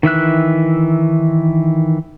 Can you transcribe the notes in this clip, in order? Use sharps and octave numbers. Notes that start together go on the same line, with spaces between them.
D#3 E3 E5 F#6